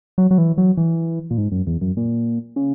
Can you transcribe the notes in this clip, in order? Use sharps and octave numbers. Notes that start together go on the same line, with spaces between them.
F#3
F#3
E3
F#3
E3
A#2
G#2
F#2
E2
F#2
A#2
C#3